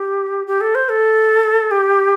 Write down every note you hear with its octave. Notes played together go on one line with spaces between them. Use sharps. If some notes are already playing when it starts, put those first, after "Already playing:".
Already playing: G4
G4
A4
C5
A4
G4